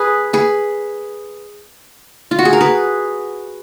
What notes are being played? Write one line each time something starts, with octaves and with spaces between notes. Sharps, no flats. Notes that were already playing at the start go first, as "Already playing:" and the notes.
Already playing: G#4 B4
G#4 B4
F4
F#4
G#4
A#4
G#4 B4